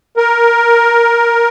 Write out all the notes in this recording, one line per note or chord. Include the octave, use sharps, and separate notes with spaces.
A#4